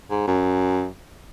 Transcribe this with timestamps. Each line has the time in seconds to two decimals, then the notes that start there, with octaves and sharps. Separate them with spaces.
0.11 G#2
0.27 F#2